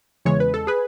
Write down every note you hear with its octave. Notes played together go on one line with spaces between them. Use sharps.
E2 C#3 E3 G#3 C#5
B4
A4
G#4 B4